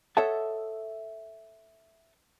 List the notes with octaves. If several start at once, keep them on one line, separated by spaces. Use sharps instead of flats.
A4 C#5 D#5 E5 F#5 A5